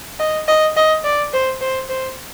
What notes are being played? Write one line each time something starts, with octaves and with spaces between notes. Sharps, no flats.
D#5
D#5
D#5
D5
C5
C5
C5